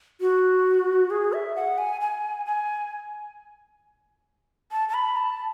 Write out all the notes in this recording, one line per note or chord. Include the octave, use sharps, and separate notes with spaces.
F#4
G#4
E5
F#5
G#5
G#5
G#5
A5
A5
B5
A5